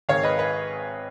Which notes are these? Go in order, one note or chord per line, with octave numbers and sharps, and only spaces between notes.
G#1 G#2 D#3 C#5 F5
B4 D#5
B4 D#5